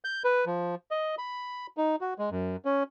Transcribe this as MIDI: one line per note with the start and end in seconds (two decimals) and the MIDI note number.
0.05 0.23 91
0.24 0.45 71
0.46 0.75 53
0.91 1.15 75
1.18 1.67 83
1.77 1.96 63
2.01 2.14 66
2.19 2.30 56
2.31 2.56 42
2.65 2.83 61